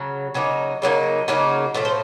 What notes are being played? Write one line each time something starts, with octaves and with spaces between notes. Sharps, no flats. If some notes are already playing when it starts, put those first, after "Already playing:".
Already playing: C#3 F#3
C#3 F#3 A#3 D#4
C#3 F#3 A#3 D#4
C#3 F#3 A#3 D#4
A2 F3 A3
C5